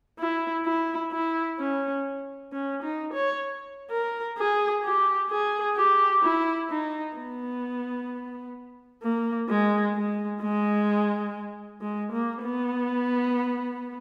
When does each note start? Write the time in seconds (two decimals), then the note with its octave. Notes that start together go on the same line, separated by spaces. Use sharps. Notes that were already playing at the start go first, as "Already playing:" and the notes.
0.20 E4
0.65 E4
1.12 E4
1.59 C#4
2.52 C#4
2.83 D#4
3.14 C#5
3.91 A#4
4.38 G#4
4.84 G4
5.30 G#4
5.76 G4
6.23 E4
6.70 D#4
7.16 B3
9.02 A#3
9.49 G#3
9.95 G#3
10.42 G#3
11.81 G#3
12.13 A#3
12.43 B3